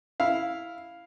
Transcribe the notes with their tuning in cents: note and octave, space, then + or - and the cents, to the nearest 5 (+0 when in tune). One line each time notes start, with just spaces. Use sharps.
E4 +0 F5 +0